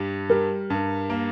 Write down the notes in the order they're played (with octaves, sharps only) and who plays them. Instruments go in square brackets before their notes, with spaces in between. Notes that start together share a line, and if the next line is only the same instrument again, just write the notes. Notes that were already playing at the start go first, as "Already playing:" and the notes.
Already playing: [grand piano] G2 G3
[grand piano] G3 [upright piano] A#4
[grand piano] G2
A#3